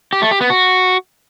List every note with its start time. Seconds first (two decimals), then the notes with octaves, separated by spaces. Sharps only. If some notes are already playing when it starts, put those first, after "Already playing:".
0.13 G4
0.22 A3
0.31 G4
0.41 B3
0.50 F#4